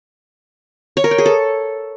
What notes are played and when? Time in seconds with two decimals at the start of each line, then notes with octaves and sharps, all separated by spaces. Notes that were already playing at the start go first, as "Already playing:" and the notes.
0.97 C#5
1.04 A#4
1.11 G5
1.18 G#4
1.26 A4